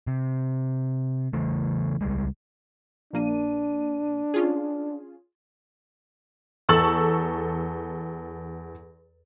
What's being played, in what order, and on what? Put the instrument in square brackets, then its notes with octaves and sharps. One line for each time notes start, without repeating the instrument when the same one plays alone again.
[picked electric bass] C3
C#3 E3 A3
C#2 G3 G#3
[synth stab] A#1 A#3 D#7 [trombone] D4
[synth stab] C#4 F4 G#4
[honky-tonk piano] E2 A4 C#6 E6 A6 F#7